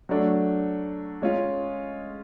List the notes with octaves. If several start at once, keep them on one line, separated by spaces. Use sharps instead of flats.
F#3 A3 D4
G#3 C#4 F4